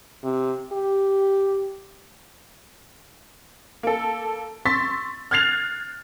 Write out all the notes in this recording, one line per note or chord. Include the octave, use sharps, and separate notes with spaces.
C3
G4
A#3 A4
C6 C#6 E6 A6 B6
F6 F#6 G#6 A6 C7 F7